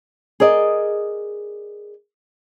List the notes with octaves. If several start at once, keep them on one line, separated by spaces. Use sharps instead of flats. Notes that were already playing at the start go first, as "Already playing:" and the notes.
G#4 A#4 D5 D#5